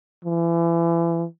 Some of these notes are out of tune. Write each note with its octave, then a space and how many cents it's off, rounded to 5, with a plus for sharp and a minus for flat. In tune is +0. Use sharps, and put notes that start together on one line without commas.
E3 +35